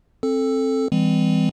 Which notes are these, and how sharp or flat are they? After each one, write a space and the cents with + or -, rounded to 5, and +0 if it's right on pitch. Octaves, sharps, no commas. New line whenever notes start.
C4 +20 A4 +0
E3 +0 G3 +45 C4 -30